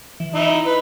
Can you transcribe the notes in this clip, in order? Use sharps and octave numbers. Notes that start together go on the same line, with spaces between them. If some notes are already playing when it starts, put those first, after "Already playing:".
E3
D#4 E4
B4 B5